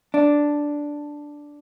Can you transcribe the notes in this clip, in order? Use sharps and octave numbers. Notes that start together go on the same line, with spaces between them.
D4